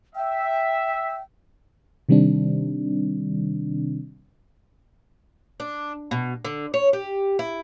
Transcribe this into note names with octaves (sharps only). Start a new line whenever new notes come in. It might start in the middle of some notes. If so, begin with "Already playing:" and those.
E5 G5
C3 D#3 G3 C4 D4
D4
B2
D3
C#5
G4
E4